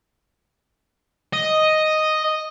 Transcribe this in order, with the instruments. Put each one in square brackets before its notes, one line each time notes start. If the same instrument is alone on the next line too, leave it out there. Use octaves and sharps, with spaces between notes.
[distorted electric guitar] D#5